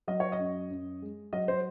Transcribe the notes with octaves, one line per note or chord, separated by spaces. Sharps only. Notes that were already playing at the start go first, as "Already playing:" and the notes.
F#3 D#5
C#5
D#5
F#2
F#2
G#3
F#3 D#5
C5